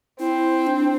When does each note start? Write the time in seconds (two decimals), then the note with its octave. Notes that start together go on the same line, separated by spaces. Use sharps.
0.19 C4 E4
0.67 D4